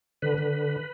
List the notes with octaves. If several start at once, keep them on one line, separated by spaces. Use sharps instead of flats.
D3 B4
D3